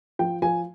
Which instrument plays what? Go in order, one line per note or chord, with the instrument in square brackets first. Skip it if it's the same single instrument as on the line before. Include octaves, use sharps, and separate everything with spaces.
[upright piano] F3 G5
F3 G#5